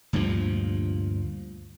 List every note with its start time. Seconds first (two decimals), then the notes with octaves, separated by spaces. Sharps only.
0.13 D2 G2 A#2 F3